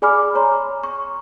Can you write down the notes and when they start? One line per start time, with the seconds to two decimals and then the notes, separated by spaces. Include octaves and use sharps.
0.02 G#4 D5 G#5 B5 D6 F6
0.35 C#5 A#5 C6
0.83 C#6